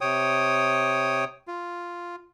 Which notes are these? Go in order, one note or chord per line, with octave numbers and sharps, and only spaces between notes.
C3 C#5 G5 D#6
F4